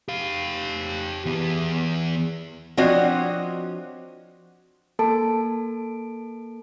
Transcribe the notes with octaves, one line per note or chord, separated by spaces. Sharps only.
G4 F5
E3 B3
F3 C4 D4 F#4 C#5 D#5
A#3 A4 A5 D7